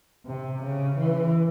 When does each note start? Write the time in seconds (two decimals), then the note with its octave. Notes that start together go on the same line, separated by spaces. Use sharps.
0.26 C3
0.63 C#3
0.98 E3